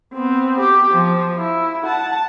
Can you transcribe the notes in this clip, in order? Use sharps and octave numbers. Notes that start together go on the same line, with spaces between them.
B3 C4
G4
F3
E4
F#5 A5